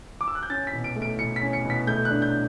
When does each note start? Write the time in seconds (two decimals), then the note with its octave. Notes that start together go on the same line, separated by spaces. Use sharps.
0.21 D6
0.28 E6
0.35 F#6
0.43 G6
0.50 C#4 A6
0.67 B6
0.73 B2
0.84 D7
0.96 A3
1.02 D7
1.19 B2 C#7
1.36 B6
1.42 C#4
1.53 C#7
1.65 B2
1.70 B6
1.87 A3 G6
2.05 F#6
2.10 D4
2.22 G6